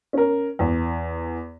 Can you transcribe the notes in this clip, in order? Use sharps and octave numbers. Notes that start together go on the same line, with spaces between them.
C#4 A#4
E2